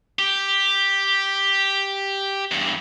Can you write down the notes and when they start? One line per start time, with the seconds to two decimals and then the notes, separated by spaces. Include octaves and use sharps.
0.19 G4
2.51 E2 G2